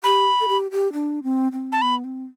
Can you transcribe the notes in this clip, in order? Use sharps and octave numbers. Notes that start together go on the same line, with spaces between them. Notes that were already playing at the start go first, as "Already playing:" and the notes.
G4 B5
A4
G4
G4
D4
C4
C4
A5
B3 B5
C4